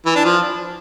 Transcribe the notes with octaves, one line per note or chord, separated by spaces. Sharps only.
E3
D4
F3